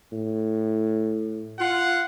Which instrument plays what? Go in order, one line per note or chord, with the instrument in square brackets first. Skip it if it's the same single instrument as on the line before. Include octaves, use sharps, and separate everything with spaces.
[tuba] A2
[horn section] F4 F#5